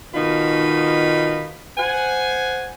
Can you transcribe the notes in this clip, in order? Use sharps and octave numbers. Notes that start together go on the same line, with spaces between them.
B2 D#3 D#4 F4 B5
C5 F#5 G#5